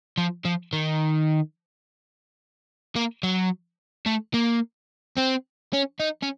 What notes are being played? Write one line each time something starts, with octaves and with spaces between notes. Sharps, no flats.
F3
F3
D#3
A#3
F#3
A3
A#3
C4
C#4
D#4
C#4